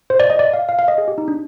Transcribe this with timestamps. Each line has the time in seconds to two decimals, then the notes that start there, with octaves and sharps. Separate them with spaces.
0.10 C5
0.20 D5
0.30 D#5
0.39 D5
0.53 F5
0.69 F5
0.79 F5
0.88 D#5
0.98 G#4
1.08 G4
1.18 D#4
1.28 D4